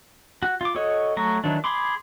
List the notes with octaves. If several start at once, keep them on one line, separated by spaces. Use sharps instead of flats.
F#4
F4 D6
F#4 A4 C#5 D#5
F#3 A3 A#5 C#6
D#3 E3 F#3 D4
G#4 B5 C6 D6